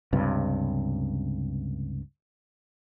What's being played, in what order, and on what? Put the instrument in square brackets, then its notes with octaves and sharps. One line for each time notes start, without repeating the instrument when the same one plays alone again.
[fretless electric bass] C#2 G2 C3